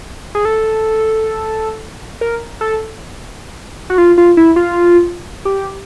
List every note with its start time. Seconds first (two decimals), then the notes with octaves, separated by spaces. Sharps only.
0.35 G#4
0.45 A4
2.21 A#4
2.61 A4
3.90 F#4
3.98 F4
4.18 F4
4.37 E4
4.56 F4
5.45 G4